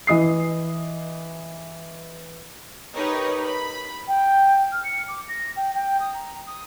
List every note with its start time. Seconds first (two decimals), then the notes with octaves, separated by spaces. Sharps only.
0.07 E3 D#5 D#6 C7
2.94 D#4 G4 A#4 B4 C#5
3.47 B5
4.07 G5
4.72 F6
4.84 C#7
5.08 D6
5.28 A#6
5.56 G5
5.74 G5
6.00 D#6
6.14 A#5
6.46 D#6